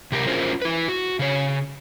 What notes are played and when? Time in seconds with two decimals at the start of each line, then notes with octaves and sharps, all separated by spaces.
0.12 C3 G4 A#4
0.27 C#4 F4 F#4 G#4 A#4 C5
0.62 E4 B4
0.89 F#4
1.19 C#3 C#5